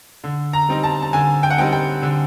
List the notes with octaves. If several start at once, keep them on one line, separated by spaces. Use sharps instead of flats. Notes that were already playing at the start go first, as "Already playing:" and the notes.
D3
A#5
G3 C4 D#4
A5
A5
D3 G#5
G5
F#5
G3 C4 D#4 G5
G5
D3